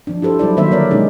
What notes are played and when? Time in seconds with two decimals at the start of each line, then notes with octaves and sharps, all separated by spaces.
0.07 F3 D4
0.22 E4 G4 A4 C5
0.39 F#3 G3 E4 D5
0.57 D#3 F#3 A#3 C5 E5
0.71 D3 A#4 C#5 D5
0.91 B2 G#3 C#4 D#4 G#4